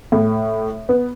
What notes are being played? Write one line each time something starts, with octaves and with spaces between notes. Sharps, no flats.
A2
B3